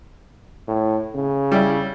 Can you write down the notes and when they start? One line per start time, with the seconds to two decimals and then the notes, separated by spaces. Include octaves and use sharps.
0.68 A2
1.15 C#3
1.52 G3 E4